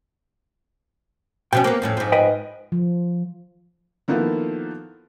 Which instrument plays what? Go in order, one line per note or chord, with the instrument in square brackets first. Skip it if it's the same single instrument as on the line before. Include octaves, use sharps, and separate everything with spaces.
[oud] B2 F3 C#4 [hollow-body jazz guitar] G5
[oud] A#3 B3
F2 A2 C#4
G#2 F3
[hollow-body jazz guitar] B4 D#5 G5
[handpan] F3
[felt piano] D#3 F3 A#3 B3 E4 A4